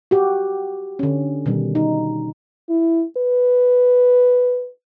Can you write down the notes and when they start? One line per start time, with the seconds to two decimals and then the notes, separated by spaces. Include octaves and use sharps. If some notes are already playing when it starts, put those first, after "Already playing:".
0.11 F#4 G4
0.99 D3 C#4
1.46 B2 D#3 G3
1.75 D#4
2.70 E4
3.17 B4